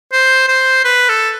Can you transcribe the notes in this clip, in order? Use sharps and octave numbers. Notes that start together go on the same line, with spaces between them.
C5
C5
B4
A4